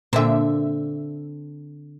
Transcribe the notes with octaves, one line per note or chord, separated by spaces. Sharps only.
A#2 D3 A#3 C4 E5